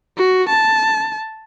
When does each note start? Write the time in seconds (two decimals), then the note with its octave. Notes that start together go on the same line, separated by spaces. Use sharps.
0.18 F#4
0.49 A5